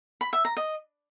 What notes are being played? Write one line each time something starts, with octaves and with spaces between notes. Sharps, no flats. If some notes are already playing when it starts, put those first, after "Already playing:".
B5
E5
A#5
D#5